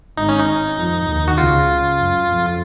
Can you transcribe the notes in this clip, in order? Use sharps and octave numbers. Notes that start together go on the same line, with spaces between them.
G#1 G#2 D#4
C#4
D#4
F2 F3
D#2 D#3
F#4
C#2 C#3 F4
F#2
F2